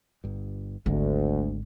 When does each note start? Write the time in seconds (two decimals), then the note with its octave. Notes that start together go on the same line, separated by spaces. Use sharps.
0.24 G1 G2
0.86 G#1 D2 D3 G#3